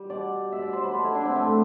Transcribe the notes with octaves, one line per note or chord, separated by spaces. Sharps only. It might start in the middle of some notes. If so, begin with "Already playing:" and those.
Already playing: G3
B2 D5
G3
B2 E5
D5
F#3 C5
B4
B2 A4
E4
F#3 D4
C4
A2 A3